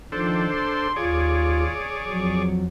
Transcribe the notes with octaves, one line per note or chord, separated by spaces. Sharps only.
D#3 F3 D4 A4 C5
C6
D#2 F4 G#4 C#5 D5
F2 F#3